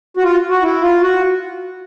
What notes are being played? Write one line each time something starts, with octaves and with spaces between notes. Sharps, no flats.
F#4
F4
F#4
E4
F4
F#4